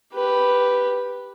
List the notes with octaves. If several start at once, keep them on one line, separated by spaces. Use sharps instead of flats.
G4 B4